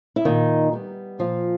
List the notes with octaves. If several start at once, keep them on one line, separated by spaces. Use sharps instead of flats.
E4
A#2 D#3 D#4
G3 B3
A#2 F3 F4